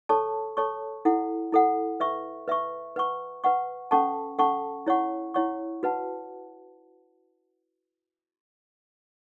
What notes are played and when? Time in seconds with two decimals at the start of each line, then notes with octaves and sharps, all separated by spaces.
0.09 A4 C#5 A5 C#6
0.57 A4 C#5 A5 C#6
1.05 E4 A4 F#5
1.52 E4 A4 F#5
2.00 B4 E5 C#6
2.48 B4 E5 C#6
2.96 B4 F#5 C#6
3.44 B4 F#5 C#6
3.91 C#4 A4 F#5 A5 C#6
4.39 C#4 A4 F#5 A5 C#6
4.87 E4 C#5 F#5 C#6
5.34 E4 C#5 F#5 C#6
5.83 F#4 B4 F#5 A5